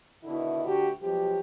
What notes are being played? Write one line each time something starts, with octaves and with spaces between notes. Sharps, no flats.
B2 D3 D#3 E4
D2 F#4 G4
B2 F3 F#3 G#3 G4